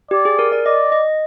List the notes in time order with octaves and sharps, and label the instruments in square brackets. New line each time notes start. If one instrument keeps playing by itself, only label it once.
[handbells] G4 [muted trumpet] D5
[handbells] G#4
A#4
D5
[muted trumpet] D5 [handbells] D#5
[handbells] D#5